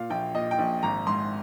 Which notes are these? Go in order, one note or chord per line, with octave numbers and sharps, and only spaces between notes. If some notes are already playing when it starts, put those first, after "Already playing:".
Already playing: A#2 F5
A#1 G5
A#2 D#5
G5
A#1
G#1 A#5
G#2 C6